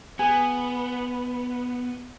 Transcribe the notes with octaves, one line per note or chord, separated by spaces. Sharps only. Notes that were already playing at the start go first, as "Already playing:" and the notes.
B3 G#4